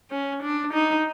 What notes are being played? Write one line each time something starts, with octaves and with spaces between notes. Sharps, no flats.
C#4
D4
D#4